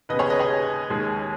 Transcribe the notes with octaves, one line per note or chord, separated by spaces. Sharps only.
D#2 C#3 B3 B4 D#5
G#4 C#5
B4 D#5
G#4 C#5
D#2 D#3 G#3